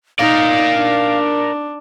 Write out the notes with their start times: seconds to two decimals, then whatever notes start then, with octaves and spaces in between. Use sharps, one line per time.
0.19 D#4 A#4 D5 F5
0.75 D4